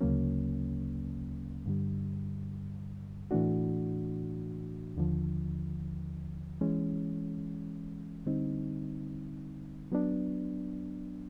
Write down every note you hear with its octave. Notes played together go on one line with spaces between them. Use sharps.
D2 C#3 F#3 A#3 C#4
G2 D3 G3
A2 E3 A3 D4 F#4
D#2 D3 F3
E3 G#3 C#4
D3 G3 C4 D#4
F#3 B3 D4